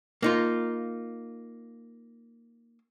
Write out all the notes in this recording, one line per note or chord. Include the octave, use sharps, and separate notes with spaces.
A#3 D#4 F4